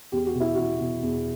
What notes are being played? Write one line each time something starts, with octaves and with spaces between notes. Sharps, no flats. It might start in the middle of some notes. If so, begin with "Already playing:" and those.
E2 G4
F#4
B2
E4
E2 F#4
B2
E2